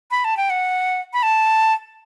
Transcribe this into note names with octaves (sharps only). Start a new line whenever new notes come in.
B5
A5
G5
F#5
B5
A5